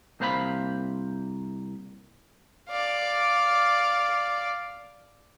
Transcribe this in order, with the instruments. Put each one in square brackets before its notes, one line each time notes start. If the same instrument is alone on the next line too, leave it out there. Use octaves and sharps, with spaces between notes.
[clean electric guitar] C2 A#3 C5 F5 F#5 B5
[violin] D5 F5